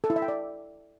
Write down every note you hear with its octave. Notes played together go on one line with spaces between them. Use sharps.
A4
E4
E5
G5
D5